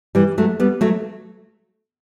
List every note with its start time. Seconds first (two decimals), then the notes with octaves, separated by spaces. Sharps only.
0.15 E3 G3
0.38 F#3 A3
0.60 G3 B3
0.81 F#3 A3